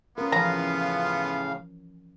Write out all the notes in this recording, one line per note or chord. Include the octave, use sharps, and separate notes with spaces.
B3 C#4 F4 A#4
A2 C#3 E3 F3 F5 A#5